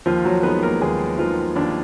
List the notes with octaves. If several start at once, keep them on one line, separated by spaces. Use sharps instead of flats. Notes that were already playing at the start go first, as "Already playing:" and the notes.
D#2 F3 F4
F#3 F#4
D#3 G#3 B3 B4
A#3 A#4
D#2 G#3 G#4
D#3 F3 G#3 F4
D#2 D4